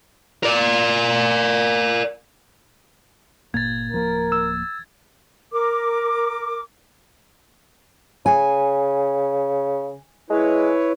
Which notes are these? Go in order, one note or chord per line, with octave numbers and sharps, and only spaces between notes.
A#4 D5
G1 A#2 A#3 G#6 A6
D1 F3 A#3 A#4
E6
A#4 D6
C#3 G#5
G#3 E4 B4 C#5